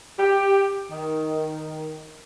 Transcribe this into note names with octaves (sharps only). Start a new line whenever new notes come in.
G4
D#3